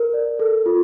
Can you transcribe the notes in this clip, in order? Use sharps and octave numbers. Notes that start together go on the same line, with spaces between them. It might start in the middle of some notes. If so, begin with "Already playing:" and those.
Already playing: A#4
D5
A4
F4